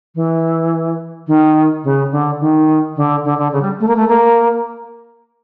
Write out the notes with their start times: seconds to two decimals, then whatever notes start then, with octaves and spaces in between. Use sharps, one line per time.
0.15 E3
1.27 D#3
1.84 C#3
2.12 D3
2.40 D#3
2.96 D3
3.25 D3
3.38 D3
3.52 C#3
3.62 G3
3.80 A3
3.88 A#3
3.96 A3
4.09 A#3